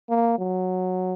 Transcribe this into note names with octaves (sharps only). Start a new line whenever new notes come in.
A#3
F#3